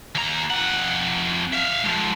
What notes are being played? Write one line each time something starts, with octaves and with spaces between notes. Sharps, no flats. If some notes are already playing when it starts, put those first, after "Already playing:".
D#2 A#5
F2 F#5
E5 F5
G#2 F3